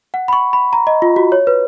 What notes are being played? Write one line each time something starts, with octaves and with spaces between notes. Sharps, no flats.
F#5
B5
C#6
B5
A#5
D#5
F4
F#4
C#5
B4